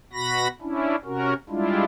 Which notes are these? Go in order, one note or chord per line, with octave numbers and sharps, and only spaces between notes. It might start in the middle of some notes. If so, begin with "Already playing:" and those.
B2 F#4 B5 A#6
C#4 D4 E4
C3 C#4 F#4 A#4
G3 G#3 D4 E4 F4